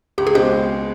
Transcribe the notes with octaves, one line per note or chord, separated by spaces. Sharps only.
C#2 G4
G#4
B2 G#3 C4 G4